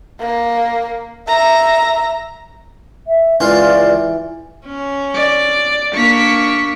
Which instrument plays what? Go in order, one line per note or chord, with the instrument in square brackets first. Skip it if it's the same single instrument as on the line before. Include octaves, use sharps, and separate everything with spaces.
[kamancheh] A#3
E5 A#5
[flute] E5
[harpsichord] C#2 F4 [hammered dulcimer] E3 [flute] D5
[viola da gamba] C#4
[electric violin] D5
[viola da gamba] A#3 D4 [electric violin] C#6 B6